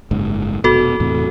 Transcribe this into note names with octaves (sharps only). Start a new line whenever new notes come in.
F#1 G#2
F1 B2 F#4 A4
E2 A2 C3